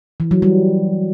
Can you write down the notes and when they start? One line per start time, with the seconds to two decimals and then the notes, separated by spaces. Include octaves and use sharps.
0.20 E3
0.31 F#3
0.42 G3